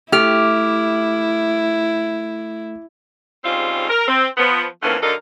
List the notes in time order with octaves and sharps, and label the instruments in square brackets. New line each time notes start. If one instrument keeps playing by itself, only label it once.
[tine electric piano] A3 F6 [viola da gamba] E4 [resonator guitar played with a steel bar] G4
[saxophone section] G#2 C#3 G3 C4 F4
A#4
C4
F3 B3
F2 D3 E3 A3 A#3 C#4
D3 F#3 D#4 A4 A#4 F5